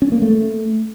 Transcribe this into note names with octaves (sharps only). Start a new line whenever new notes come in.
C#4
A#3
A3